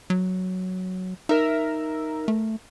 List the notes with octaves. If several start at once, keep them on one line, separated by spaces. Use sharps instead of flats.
F#3
D#4 A#4 E5
A3